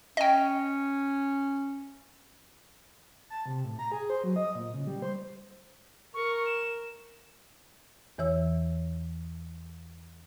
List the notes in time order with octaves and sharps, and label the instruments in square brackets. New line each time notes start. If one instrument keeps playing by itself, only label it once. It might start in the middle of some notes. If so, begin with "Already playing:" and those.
[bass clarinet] C#4 [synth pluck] D#5 G5
[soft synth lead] A5
C3
A2
A#5
G#4
C5
F#3
D#5
A#2
C#3
G3
C5
[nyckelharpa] A#4 [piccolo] C#6
[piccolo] E7
[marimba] E2 E3 C#5 E6